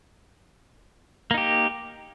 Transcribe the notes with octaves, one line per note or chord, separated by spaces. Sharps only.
A#3 D#4 G4